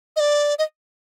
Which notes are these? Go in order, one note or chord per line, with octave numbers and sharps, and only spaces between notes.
D#5
D5
D#5